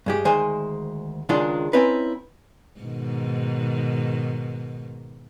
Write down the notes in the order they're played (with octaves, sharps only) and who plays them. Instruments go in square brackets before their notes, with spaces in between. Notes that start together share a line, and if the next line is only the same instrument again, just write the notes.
[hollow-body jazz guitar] G2 G#3 G4
D2 D#3 G#3 C5 G#5
C#2 D#3 G#3 D4 F4 C6
C4 C#4 D#4 E4 B4
[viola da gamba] G#2 B2 D#3